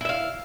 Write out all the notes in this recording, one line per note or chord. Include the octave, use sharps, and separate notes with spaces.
E4 E5 F5